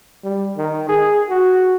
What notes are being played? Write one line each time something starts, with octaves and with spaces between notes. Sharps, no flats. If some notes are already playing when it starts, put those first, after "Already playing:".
G3
D#3
G#4
F#4